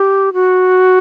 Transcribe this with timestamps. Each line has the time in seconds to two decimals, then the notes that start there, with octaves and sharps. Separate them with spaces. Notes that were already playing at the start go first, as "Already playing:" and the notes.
Already playing: G4
0.33 F#4